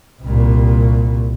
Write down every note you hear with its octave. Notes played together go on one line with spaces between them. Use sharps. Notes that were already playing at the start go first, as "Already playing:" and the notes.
C2 A#2